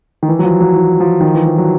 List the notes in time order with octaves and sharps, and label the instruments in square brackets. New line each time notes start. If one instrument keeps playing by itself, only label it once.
[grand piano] D#3
E3
F#3
F3
F#3
E3
F3
D#3
E3
F3
F#3